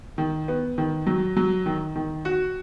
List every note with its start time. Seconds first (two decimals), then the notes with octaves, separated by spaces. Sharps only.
0.18 D#3
0.48 B3
0.78 D#3
1.07 F#3
1.37 F#3
1.66 D#3
1.96 D#3
2.25 F#4